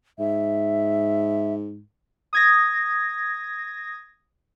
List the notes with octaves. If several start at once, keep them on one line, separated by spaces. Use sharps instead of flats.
G#2 E5
D#6 G#6 A#6